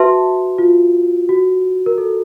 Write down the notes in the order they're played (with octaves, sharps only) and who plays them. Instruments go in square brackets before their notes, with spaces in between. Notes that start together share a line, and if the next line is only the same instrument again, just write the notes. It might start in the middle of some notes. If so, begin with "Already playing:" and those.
Already playing: [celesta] F#4 [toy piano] B4 E5 A5 C6
[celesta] F4
F#4
A#4
A4